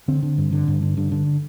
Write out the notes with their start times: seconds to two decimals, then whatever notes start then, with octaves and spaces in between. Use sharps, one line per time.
0.08 D3 C4
0.23 D3
0.38 G2
0.52 D3
0.68 G2
0.82 D3
0.97 G2 D3
1.12 D3